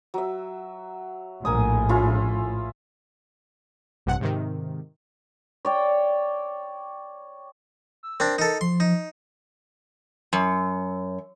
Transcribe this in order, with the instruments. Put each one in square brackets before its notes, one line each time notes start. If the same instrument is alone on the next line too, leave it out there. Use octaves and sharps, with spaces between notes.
[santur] F#3 E5
[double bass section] A#1 A2 [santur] A#4 G#5 D#6
[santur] C#4 E4 F4
[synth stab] A#1 G2 C3 F#5
G#2 C3 D#3
[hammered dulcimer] C#5 D5 G5
[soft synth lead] E6
[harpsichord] C4 D4 [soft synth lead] A#4
[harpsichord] D#4 A4
[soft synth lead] F3 [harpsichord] C6
[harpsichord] D#4
[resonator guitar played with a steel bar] F#2